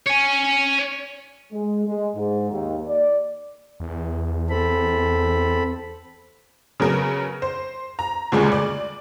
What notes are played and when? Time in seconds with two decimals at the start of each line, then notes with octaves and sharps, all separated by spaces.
0.07 C#5 G#5
1.52 G#3
1.86 G#3
2.15 G#2
2.50 D#2
2.87 D5
3.80 E2
4.50 C4 A4 B5
6.80 C#3 F#3 B3 A#4
7.42 C5
7.99 A#5
8.32 D2 A#2 C#3 G3 G#3
8.52 D5